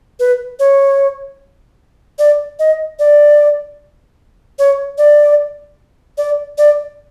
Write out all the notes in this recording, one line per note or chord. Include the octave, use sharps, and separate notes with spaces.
B4
C#5
D5
D#5
D5
C#5
D5
D5
D5